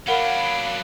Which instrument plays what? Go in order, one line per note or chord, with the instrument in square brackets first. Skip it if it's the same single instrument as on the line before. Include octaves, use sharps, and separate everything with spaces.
[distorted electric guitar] F#3 D4 [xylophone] A#4 F#5 [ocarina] F5 [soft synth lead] B5